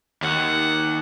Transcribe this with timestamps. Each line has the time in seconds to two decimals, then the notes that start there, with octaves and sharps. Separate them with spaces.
0.22 D#2 F#5